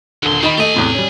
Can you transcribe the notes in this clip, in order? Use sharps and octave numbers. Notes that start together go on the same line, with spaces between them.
D#1 D#2 D3 C6
D#3 G3 D#5 B5
A3 G4 D#5 G#5
E2 A2 C3
G3 C#4